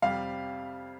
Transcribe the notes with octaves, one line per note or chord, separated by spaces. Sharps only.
F2 C3 G3 F5